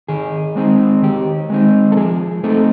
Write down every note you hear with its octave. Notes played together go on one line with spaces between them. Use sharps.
D#3 G#4
G#3 C4 D#4
D#3 G4
G#3 C4 D#4
A4
F3 G#4
A3 C4 D#4 A4